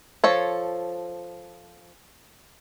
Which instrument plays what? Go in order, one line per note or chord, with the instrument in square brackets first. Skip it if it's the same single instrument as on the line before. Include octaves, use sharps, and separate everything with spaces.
[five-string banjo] F3 A4 C#5